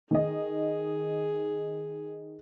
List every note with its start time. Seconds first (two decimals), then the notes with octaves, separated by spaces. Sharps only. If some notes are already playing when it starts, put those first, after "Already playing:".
0.11 D#3 G#4 D#5